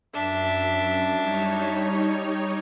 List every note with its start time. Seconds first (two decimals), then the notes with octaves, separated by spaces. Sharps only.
0.14 F#2 D4 E5
1.17 G3 D#4 C#5